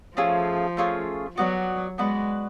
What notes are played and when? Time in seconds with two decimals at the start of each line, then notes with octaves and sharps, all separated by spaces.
0.16 F3 A3 C#4 F4 G#4
0.77 A3 C#4 F4 G#4
1.37 F#3 B3 F#4 B4 D5
1.98 G#3 B3 F#4 B4 D5